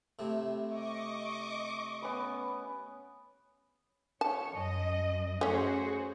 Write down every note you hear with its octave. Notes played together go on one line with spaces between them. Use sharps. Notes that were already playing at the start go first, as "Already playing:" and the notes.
A2 C3
D#5 C#6 D6
B3 C#4 B4
C#5 A5
F#2 D#5
A3 C#4 F#4 G#4 C5